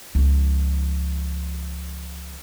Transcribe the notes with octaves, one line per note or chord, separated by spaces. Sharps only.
C#2 F3